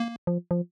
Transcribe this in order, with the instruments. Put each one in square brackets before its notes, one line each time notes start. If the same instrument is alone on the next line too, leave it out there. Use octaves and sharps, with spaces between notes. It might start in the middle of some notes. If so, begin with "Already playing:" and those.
Already playing: [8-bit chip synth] A#3
[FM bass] F3
F3